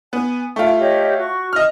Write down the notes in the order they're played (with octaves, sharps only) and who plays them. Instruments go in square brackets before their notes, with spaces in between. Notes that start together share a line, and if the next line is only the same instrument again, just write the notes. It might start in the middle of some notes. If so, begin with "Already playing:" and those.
[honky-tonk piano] B3 [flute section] G#5
[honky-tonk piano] A3 F4 [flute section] G5
[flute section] G4 C#5 D#5
F#4 C#6
[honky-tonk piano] D#5 F6